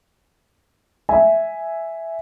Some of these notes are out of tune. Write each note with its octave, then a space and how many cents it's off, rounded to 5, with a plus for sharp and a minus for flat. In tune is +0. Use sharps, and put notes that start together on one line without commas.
E5 +0 G#5 +0